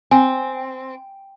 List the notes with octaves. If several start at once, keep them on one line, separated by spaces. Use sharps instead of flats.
C4 G#5